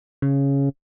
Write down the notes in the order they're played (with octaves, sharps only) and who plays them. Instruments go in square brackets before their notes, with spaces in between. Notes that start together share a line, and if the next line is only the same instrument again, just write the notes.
[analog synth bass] C#3